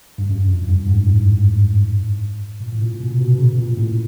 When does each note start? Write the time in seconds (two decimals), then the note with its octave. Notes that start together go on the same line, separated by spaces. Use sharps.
0.18 G2
0.29 F#2
0.48 F2
0.69 G2
0.87 G#2
1.07 A2
2.60 A#2
2.72 A2
2.82 A#2
3.00 B2
3.10 C3
3.21 B2
3.38 C#3
3.58 A#2
3.77 A2